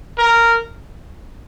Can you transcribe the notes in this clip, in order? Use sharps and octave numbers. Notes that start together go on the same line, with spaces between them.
A#4